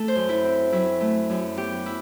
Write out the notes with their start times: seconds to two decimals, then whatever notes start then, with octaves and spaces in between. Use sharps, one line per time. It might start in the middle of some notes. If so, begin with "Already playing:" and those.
Already playing: A3 A4
0.08 C5
0.16 F#2
0.29 E4
0.44 C4
0.72 F#3 E4
1.01 A3
1.30 F#2
1.57 B3 G4
1.86 E4